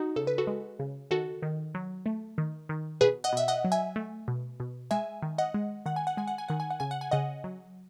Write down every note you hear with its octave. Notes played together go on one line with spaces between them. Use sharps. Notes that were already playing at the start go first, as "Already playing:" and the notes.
Already playing: D#4 F#4
C#3 A4
B4
F#4 A4
G#3
C#3
D#3 F#4 A4
D#3
F#3
A3
D#3
D#3
B2 G#4 B4
D#5 F#5
B2 E5
D#5 F#5
F#3
E5 G#5
A3
B2
B2
G#3 E5 G#5
D#3
D#5 F#5
G#3
D#3 F#5
G#5
F#5
G#3 G#5
F#5
G#5
D#3 F#5
G#5
F#5
C#3 G#5
F#5
G#5
C#3 D#5 F#5
F#3